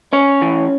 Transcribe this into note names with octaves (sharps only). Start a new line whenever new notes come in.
C#4 C#5
E3